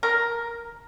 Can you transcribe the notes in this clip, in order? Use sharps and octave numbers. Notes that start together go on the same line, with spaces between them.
A#4